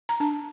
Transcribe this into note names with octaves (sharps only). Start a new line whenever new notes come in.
A#5
D4 A5